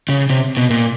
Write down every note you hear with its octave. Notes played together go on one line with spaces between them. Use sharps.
C#3
C3
B2
A#2